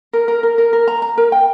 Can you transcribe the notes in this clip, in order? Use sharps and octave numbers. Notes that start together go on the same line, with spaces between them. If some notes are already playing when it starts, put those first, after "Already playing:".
A#4
A#4
A#4
A#4
A#4
A#5
A#5
A#4
G5